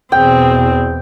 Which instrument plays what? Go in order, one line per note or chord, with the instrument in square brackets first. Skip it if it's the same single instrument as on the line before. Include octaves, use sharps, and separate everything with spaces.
[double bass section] E2 B2 [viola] C4 G#4 [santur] G5